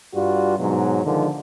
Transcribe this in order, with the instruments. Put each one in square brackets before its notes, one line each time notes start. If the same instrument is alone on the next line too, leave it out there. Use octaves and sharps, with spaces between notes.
[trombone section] G2 G3 F4 F#4
G#2 B2 F#3
D3 D#3 F3 G#3